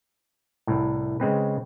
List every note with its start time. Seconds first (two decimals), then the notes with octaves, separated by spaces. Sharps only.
0.67 C2 A2
1.20 C#3 G#3 C4 B4